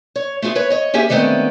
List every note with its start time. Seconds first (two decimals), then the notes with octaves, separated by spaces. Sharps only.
0.16 C#5
0.42 A3 B3 F4 G#4
0.55 B4 C#5
0.70 C#5 D#5
0.94 A#3 C#4 G4 G#4 E5 G#5
1.09 D3 D#3 G#3 A3 B3 C4